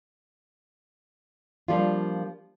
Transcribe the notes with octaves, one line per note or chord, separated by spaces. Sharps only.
F3 G3 A#3 D4 F4